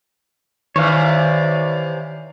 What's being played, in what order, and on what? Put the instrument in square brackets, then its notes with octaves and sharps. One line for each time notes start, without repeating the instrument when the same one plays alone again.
[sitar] C3 E3 [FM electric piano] D#3 [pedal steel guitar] C#5 F5 [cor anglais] D5